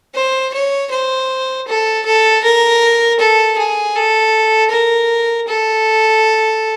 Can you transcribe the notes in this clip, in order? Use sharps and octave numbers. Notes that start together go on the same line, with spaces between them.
C5
C#5
C5
A4
A4
A#4
A4
G#4
A4
A#4
A4